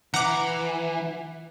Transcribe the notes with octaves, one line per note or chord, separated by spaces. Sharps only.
E3 F#5 A#5 D6